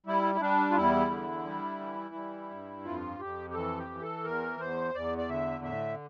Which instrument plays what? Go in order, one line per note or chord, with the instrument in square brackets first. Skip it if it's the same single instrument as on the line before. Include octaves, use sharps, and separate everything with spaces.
[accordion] G3 E4
E4
G3 D4
F4
E2 E4
D3
G3
E3
G3
G2
F2 F4
F2 G4
G4
E3 A4
G4
E3
A4
E2 A#4
E2 C5
E2 D5
D5
D3 E5
A2 E5